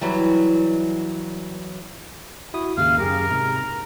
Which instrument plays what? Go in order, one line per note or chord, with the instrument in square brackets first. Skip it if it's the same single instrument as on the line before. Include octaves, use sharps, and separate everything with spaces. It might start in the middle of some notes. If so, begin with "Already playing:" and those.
[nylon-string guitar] E3 F#3 G3
[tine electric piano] E4 F#4 D#6
[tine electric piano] D#2 G#2 C#3 [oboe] F5
[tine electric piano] F#2 G4 G#4 [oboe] A#4
[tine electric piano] G#2 C3 A#5
A#5